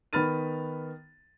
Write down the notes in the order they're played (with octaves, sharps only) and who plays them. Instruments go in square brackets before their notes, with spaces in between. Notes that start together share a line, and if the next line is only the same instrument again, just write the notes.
[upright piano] D#3 B3 B5 F6 A6 D#7